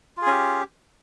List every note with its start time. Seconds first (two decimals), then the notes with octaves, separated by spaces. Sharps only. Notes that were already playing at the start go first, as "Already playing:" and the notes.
0.17 F4
0.22 G#4
0.27 C#4
0.32 G4